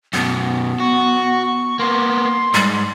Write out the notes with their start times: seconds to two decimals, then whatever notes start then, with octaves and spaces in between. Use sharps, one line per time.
0.13 F#2 B2 B3
0.80 F#4 C#6
1.79 A#3 B3 C6
2.54 G#2 G3